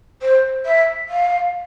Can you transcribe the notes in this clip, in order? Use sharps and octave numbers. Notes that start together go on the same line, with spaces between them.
C5
E5
F5